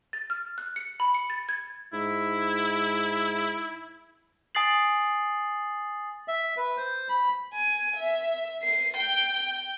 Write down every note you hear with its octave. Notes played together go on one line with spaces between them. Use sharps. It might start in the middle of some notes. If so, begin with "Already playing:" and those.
A6
F6
F#6
C#7
B5
C#7
A6
G#6
G#2 E4
G#5 D#6 A6 C7 F#7
E5
B4
C5
B5
G#5
E5
C7
G5